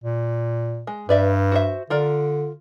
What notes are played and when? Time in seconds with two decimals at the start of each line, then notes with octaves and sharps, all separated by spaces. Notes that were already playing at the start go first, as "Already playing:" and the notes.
0.04 A#2
0.87 G#3
1.09 G2 B4 D5 E5
1.52 F#4 C5 E5
1.90 D3 F4 A#4 D5